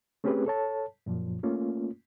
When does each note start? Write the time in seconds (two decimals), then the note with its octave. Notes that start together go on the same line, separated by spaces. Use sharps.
0.24 A3 C4 C#4 G4 G#4 B4
0.46 A4 C#5 A5
1.06 F#2 A#2 F3
1.43 A3 A#3 C#4 F4